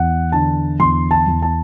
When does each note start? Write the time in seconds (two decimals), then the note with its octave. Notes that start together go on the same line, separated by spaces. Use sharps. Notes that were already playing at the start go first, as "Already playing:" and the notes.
Already playing: E2 F#5
0.32 D3 A5
0.80 E2 C6
1.11 A5
1.27 E2
1.42 A5